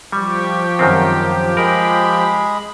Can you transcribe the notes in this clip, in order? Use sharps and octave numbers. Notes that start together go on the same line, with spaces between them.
F3 G3 G4 C#6
F#2 D#3 G#3 A#3 C4
G#3 G#4 A#4 B5